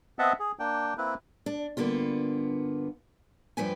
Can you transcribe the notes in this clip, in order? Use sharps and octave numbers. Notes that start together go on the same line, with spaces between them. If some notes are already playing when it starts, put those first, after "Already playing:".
B3 C4 D#5 E5 F#5 A5
G#4
A#3 D4 G5
A#3 C4 E4 B4
D4
G2 D3 A#3 B3 F4
G2 F3 A3 B4 G5 G#5